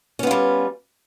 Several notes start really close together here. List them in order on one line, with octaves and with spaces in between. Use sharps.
C#4 B3 F4 G3